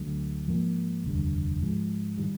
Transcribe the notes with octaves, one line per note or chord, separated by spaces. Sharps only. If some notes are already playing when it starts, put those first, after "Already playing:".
Already playing: D2 D3 F#3 A3
G#2 F3 A#3
F1 D#2 D3 G3
G#2 F3 G#3
D#3 G3